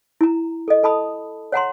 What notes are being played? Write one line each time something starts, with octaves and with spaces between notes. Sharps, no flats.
E4 A#5
A4 D#5
A4 A5 B5 D#6
C#5 F#5 A#5 C6